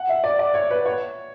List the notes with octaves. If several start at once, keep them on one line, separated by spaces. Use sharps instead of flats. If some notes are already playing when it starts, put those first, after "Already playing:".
Already playing: F#5
E5
D5
D5
C#5
B4
C#5